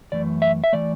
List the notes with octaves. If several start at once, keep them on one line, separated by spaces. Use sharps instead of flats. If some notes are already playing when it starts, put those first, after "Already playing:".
F#2 E3 A3 D5
E5
E5
E3 A3 D5